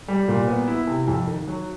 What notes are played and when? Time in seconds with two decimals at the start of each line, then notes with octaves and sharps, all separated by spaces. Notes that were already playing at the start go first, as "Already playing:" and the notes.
0.08 G3
0.28 A#2
0.48 B3
0.68 E4
0.87 C3
1.08 F2
1.27 D#3
1.47 F#3